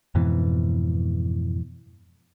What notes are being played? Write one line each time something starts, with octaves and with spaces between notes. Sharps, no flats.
F2 G#2 B2 E3